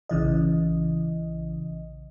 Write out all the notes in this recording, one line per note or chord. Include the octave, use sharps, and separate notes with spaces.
A#1 C#3 E3 D#5